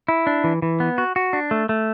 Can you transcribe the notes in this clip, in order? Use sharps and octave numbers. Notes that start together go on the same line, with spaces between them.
E4
D4
E3
E3
B3
F#4
F#4
D4
A3
A3